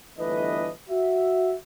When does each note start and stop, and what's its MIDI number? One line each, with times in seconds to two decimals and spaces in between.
0.19 0.70 31
0.19 0.70 52
0.19 0.70 57
0.19 0.70 62
0.19 0.70 71
0.19 0.70 75
0.90 1.54 66
0.90 1.54 76